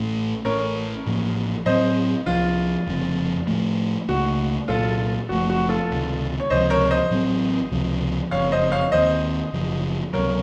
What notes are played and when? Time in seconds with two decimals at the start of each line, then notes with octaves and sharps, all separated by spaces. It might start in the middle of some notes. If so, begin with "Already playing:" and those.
Already playing: A1 A2 A3 C#4
0.45 A1 A2 A3 C#4 A#4 C#5
1.06 A1 A2 F3 A#3
1.66 A2 F#3 C4 C5 D#5
2.26 C2 C3 F3 F4
2.87 F1 F2 C#3 F3
3.47 A2 F3 A3
4.08 C#2 C#3 A3 F#4
4.68 C2 A#2 F#3 F4 A4
5.29 F#1 F#2 F3 A3 F#4
5.49 F#4
5.69 F4 A4
5.89 C#2 C3 D#3
6.40 C#5
6.50 C#2 C3 F3 C5 D#5
6.70 A#4 C#5
6.90 C5 D#5
7.10 A1 A2 F#3 C4
7.71 C#2 C3 F3
8.31 F#1 F2 C#3 C#5 F5
8.52 C5 D#5
8.72 C#5 F5
8.92 D#2 D#3 F#3 C4 C5 D#5
9.53 F#1 F#2 C#3 F3
10.13 C#2 C3 F#3 A#4 C#5